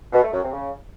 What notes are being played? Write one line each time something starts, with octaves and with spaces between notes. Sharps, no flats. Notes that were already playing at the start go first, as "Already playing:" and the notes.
B2
A3
F#2
C3
C#3